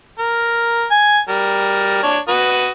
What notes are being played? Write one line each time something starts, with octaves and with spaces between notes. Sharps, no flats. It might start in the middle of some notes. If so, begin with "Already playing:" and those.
A#4
G#5
G3 A#4
D4 C#5
F#4 B4 D#6